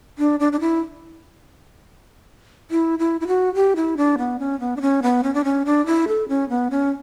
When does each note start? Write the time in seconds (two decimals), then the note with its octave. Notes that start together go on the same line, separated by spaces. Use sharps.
0.18 D4
0.40 D4
0.53 D4
0.60 E4
2.71 E4
2.99 E4
3.21 E4
3.28 F#4
3.55 G4
3.76 E4
3.97 D4
4.18 B3
4.39 C#4
4.60 B3
4.77 D4
4.82 C#4
5.02 B3
5.23 C#4
5.34 D4
5.44 C#4
5.66 D4
5.86 E4
6.08 A4
6.29 C#4
6.49 B3
6.71 C#4